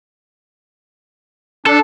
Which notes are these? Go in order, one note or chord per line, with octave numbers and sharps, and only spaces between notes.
D4 A4